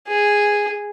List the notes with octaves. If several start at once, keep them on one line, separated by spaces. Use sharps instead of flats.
G#4